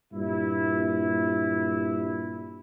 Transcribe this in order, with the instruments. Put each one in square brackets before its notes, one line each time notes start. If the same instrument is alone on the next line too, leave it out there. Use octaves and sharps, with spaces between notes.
[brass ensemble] G2 A#2 E4